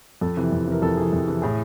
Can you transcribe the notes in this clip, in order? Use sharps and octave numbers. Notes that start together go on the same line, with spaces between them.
F2 A4
C3 E3
F2
C3 E3 A#4
F2 A4
C3 E3 G#4
F2
C3 E3
A2 G#4